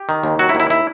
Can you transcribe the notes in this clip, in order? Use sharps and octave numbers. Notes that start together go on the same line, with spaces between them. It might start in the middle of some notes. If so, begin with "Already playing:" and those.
Already playing: G4
D#3
D#2
F#3 F#4
E4
D#2
E4
E4